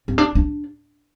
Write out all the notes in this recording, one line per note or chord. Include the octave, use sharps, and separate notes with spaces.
C4
D4
D4